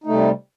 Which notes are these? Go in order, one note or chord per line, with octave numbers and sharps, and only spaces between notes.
C3 G3 A3 D#4